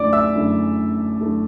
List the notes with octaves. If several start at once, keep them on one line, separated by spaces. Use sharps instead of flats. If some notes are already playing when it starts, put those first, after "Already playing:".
Already playing: F#2 D3 A3 E4 D5 D6
E5 E6
F#2 D3 A3 E4
F#2 D3 A3 E4